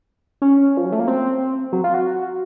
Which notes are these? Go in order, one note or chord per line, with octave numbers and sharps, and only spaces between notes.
C#4
F3
F#3
A3
A#3
C4
F#3
F4
F#4